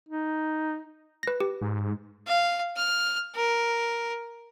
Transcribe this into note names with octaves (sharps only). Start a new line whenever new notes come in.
D#4
B4 A#6
G4
G#2
F5
F6
A#4